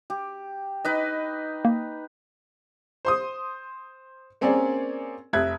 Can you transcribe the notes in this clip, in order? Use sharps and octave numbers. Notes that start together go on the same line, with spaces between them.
G4
D#4 B4 D#5
A#3
C5 C6 D#6
A#3 C4 C#4 G#4 A#4 D5
F1 E5 F#6 G#6